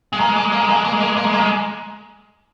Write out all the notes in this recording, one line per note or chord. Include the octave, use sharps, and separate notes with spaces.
G#3
A#3
G#3
A#3
G#3
A#3
G#3
A#3
G#3
A#3
G#3
A#3
G#3
A#3
G#3
A#3
G#3